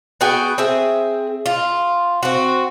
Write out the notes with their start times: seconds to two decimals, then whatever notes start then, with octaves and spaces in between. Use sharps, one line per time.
0.21 B3 F#4 G#4 G5
0.58 C4 G#4 E5
1.46 F4
2.23 C4 F#4